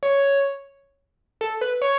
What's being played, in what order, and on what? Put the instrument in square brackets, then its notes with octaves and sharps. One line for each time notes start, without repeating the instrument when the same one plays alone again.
[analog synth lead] C#5
A4
B4
C#5